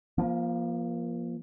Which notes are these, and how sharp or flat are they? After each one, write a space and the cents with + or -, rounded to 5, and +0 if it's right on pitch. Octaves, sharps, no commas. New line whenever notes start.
F3 -10 A#3 +30